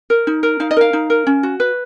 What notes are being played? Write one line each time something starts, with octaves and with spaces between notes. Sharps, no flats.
A#4
D#4
A#4
D#4 F5
D#5
A#4 F5
D#4
A#4
C#4
F#4
B4